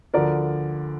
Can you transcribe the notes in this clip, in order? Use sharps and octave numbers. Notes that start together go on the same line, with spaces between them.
D2 D3 F3 A#4 D5